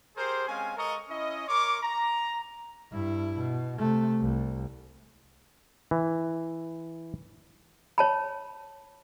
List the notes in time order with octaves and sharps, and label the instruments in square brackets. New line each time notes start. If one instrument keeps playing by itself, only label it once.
[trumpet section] G4 G#4 A#4 C5
G#3 C4 C#4 F5 G#5
G#3 A4 A#4 D#5 A#5 C#6
C#4 E4 D#5
A#4 C#5 C6 D6
A#5
[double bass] G2 E4
B2
C3 A3
C2
[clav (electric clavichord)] E3
[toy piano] C#5 A5 B5